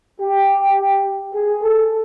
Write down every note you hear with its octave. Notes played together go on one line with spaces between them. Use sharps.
G4
G#4
A4